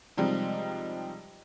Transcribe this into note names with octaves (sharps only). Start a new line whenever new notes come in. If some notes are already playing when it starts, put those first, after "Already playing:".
C3 F3 G3 G#3 D#4